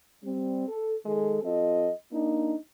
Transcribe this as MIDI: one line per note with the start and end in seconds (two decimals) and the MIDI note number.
0.23 0.68 55
0.23 0.68 60
0.68 0.96 69
1.06 1.40 51
1.06 1.40 56
1.06 1.40 68
1.06 1.40 69
1.43 1.90 53
1.43 1.90 60
1.43 1.90 65
1.43 1.90 69
1.43 1.90 75
2.13 2.54 58
2.13 2.54 62
2.13 2.54 63